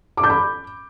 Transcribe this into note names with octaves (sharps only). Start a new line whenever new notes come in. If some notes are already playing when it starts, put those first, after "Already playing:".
D6
G6
B5